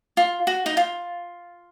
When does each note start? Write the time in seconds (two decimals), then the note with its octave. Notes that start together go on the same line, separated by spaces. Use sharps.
0.17 F4
0.47 F#4
0.66 D#4
0.77 F4